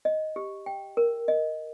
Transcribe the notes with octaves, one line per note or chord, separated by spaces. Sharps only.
D#5
G4
G5
A#4
D#5